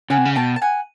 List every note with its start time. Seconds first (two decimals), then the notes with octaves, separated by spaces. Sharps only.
0.10 C#3 F#5 G#5
0.18 C3
0.25 C#3
0.36 B2 G5 A5
0.56 A5
0.62 F#5 G#5